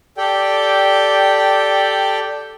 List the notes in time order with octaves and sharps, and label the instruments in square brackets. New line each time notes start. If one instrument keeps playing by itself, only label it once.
[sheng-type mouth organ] G4 A4 D5 G5